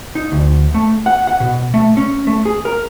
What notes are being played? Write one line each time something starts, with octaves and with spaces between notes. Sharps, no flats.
D#4
D2
A3
F#5
F#5
B2
A3
C#4
A3
G#4
A#4